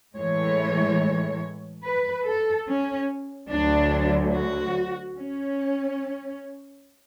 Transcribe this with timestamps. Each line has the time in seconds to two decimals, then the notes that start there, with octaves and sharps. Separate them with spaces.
0.16 A2 E3 G#3 C#5
1.83 B4
2.25 A4
2.66 C#4
3.50 D2 D3 F#3 D4
4.34 F#4
5.17 C#4